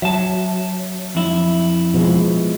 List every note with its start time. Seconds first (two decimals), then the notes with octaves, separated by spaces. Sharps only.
0.02 F#3 E5 A5
1.15 F2 E4
1.94 B2 F3 G#3